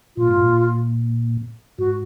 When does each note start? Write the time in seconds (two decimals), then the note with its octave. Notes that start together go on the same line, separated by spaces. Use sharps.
0.17 A#2 F4
0.28 G#2
0.41 A#2
1.79 G#2 F#4